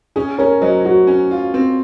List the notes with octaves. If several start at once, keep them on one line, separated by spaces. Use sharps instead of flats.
C#4 G#4
C#4 A#4 C#5
F#3 C5 D#5
F#3 F#4
C#4
F4
C4